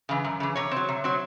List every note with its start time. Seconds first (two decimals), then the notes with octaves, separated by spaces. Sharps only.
0.09 C#3 E3
0.25 F#2
0.40 C#3 E3
0.56 C3 C#5
0.71 C4
0.76 F#3
0.89 C3
1.04 F#3 C4